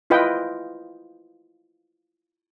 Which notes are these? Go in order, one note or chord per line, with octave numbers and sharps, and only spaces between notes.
E4 F4 B4 D#5 G5